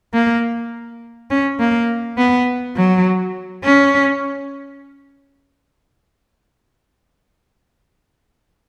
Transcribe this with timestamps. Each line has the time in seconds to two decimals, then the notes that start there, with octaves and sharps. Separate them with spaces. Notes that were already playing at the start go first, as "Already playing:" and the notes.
0.14 A#3
1.31 C#4
1.60 A#3
2.17 B3
2.76 F#3
3.64 C#4